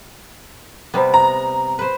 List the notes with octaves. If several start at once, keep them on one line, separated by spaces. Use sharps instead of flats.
C3 G3 B3
A#5
B4 C5